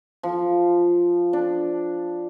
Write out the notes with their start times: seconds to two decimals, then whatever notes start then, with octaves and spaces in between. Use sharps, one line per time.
0.23 F3
1.33 D4